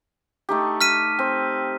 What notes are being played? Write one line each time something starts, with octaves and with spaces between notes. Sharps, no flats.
A3 D#4 G4
F6 B6 D#7
C4